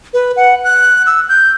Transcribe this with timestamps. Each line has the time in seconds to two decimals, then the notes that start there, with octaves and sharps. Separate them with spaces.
0.14 B4
0.37 F#5
0.64 F#6
1.06 E6
1.29 G6